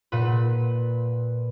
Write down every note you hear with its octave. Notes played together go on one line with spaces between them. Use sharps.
A#2 B4